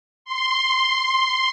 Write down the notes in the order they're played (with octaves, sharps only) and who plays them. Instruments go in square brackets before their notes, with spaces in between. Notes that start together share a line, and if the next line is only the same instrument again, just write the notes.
[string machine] C6